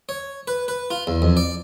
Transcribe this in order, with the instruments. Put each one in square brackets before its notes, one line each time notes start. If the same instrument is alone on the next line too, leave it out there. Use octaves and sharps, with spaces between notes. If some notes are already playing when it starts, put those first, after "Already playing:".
[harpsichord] C#5
B4
B4
F4
E2
F2
D5